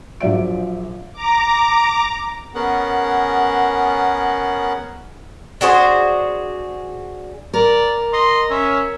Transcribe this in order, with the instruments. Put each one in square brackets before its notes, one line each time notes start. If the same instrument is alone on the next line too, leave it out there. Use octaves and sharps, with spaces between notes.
[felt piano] A#1 F3 F#3 D5 E5 D7
[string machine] A#5 D6
[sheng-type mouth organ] B3 C#4 G#4 A#4 F#5
[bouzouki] D4 F#4 G#4 C5
[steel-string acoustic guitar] A#4 [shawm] D5
[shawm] D#5 [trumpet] C6
[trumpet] C#4 [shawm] E5